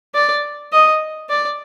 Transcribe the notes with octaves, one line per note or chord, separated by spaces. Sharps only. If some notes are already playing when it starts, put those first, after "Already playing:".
D5
D#5
D5